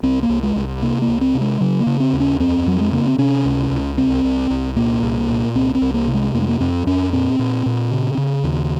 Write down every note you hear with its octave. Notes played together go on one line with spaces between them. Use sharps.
C2 C4
A#3
C2
G#3
C2
C3 A#3
A#3
C#2
C4
C3
G#3
C#3 F#3
A#3
C#3
C4
D#2
C#4
F2 C4
F2 F#3
G#3
C#3 A#3
C4
C3 C#4
C#2
C#2
C2 C4
C2
C2
A#2 A#3
C2
A#2
C2 C4
C4
C2
A#3
C3
G#3
F2 A#3
G#3
A#3
F2 C4
F2 C#4
A#2 C4
A#2
A#2
C#3
C#3
D#2